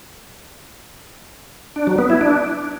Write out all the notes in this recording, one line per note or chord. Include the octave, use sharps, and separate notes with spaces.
D4
F#3
B3
E4
D4